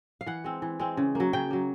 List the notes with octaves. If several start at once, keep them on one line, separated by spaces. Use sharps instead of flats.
F5
E3 F#5
G#3 C4
E3
G#3 C4
C#3
F#3 A#3
C#3 G5
F#3 A#3